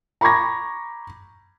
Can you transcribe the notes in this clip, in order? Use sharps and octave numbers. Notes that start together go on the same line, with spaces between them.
A#5 B5 C#6 D6 G#6 A#6